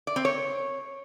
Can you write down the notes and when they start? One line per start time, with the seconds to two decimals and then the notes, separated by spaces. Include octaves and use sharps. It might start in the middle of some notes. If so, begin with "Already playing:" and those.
0.07 D5
0.16 C4
0.25 C#5